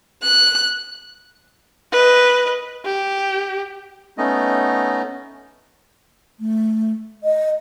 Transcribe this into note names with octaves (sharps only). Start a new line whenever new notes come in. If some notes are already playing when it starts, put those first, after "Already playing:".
F#6
B4 D#5
G4
A3 B3 C#4 D#4 D#5
A3
D#5